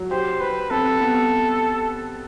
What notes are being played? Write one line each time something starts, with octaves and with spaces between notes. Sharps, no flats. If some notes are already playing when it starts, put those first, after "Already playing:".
Already playing: F#3
G4 C5
G3 B4
C4 A4
B3